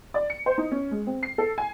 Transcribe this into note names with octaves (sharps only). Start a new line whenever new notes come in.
D5
C#7
C5
D#4
C#4
G#3
C4
C7
A4
G#5